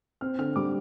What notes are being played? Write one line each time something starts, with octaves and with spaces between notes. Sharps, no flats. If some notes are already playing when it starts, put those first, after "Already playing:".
C4 F6
D3 F6
G3 D6